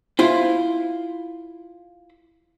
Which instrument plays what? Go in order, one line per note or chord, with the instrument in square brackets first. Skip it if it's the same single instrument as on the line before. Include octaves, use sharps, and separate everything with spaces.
[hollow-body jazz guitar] E4 F4 C5